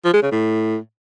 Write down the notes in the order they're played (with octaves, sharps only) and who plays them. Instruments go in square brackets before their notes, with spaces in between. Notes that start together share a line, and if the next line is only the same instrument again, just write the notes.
[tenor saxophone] F3
G#3
C#3
A2